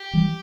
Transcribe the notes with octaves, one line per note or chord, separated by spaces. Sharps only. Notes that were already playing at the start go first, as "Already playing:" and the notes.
Already playing: G4
E3 G3